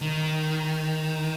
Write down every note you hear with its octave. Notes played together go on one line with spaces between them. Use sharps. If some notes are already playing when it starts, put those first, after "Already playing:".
D#3